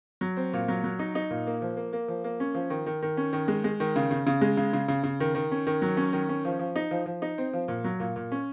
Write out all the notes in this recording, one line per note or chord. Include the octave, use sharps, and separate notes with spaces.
F#3
C4
A#2
F#3
F#3
D#4
D#4
A#2
A#3
F3
A#3
A#3
F3
A#3
C#4
F3
D#3
D#3
D#3
C#4
D#3
G#3
G#3
D#3
C#3
C#3
C#3
G#3
C#3
C#3
C#3
C#3
D#3
D#3
C#4
D#3
F#3
C#4
D#3
C#4
F3
F3
D#4
F3
F3
D#4
C4
F3
A#2
F#3
A#2
A#2
C#4